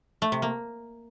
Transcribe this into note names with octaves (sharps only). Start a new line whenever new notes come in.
A3
C3
A#3